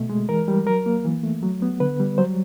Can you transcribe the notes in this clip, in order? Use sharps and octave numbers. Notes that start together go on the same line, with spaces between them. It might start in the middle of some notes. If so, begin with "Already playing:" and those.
Already playing: B2 A3
G#3
E3 A#4
G3
F#3 A#4
A#3
E3
A3
F#3
B3
D3 B4
G3
F#3 C5